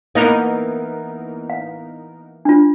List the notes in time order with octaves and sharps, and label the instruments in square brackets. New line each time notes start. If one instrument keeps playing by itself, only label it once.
[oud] E3 A#3 [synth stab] B3 D#4 A#4
[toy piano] F5
D4 F4